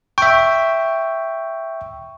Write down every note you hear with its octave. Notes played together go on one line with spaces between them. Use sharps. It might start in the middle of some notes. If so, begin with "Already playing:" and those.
E5 G5 C#6